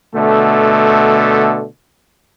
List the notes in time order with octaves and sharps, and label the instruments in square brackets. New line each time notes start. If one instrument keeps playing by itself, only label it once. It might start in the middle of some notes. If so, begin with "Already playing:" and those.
[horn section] B2 D3 A3